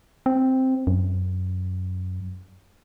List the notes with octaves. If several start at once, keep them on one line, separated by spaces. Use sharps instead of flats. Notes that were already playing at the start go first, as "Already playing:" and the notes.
C4
F#2